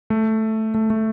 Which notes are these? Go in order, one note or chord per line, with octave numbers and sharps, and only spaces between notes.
A3
A3
A3